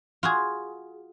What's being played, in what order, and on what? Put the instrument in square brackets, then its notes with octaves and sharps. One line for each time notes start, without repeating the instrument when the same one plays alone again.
[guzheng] F4 F#4 G#4